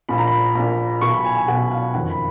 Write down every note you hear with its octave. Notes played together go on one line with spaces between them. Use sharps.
A#1 A#2 B5
A#5
B5
A#1 A#2
B1 B2 C#6
B5
G#5
G#5
B1 B2 F#5
F5
F#1 F2 D#3 F#5
B5